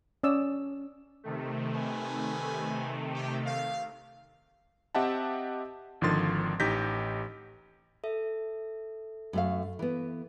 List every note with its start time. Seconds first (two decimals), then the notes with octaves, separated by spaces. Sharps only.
0.23 C#4 C#5 D5 D#6 E6
1.24 C3 D#3 A3
1.72 G3 B4 G#5
3.13 G4
3.45 F5
4.95 C4 G4 D#5 E5 F#5 A5
6.01 G#1 D3 D#3 F3 C6 A6
6.60 A1 D#4 G4 G6 A#6 B6
8.04 A4 E5
9.33 F#2 A3 F5
9.79 E3 B3